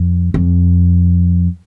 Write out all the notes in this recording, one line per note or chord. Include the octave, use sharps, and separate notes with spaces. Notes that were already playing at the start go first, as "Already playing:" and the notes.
Already playing: F2
F2